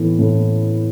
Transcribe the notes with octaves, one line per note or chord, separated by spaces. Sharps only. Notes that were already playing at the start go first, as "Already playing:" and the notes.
Already playing: A2 E3 B3
A2